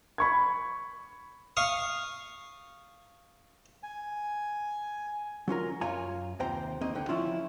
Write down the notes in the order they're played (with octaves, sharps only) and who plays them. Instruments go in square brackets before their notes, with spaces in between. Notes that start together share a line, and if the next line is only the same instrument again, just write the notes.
[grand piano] B5 C#6 G#6
[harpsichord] F5 C#6 D#6
[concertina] G#5
[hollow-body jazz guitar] F#3 C#4 F4 A#4
F#2 F4 C#5 G#5 A#5
D#2 C3 C5 G5 A#5
D#3 A#3 C4 D#5
C#2 D3 G5
F3 C#4 E4 F4